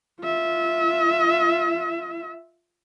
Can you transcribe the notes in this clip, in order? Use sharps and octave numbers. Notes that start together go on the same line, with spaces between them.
F4 E5